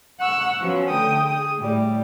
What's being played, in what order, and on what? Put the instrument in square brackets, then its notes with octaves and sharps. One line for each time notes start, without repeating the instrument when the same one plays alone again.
[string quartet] F#5 C#6 E6 F#6
F3 F#3 B3 C#4
D3 A3 G5 D#6
G#4 D#6
A2 G3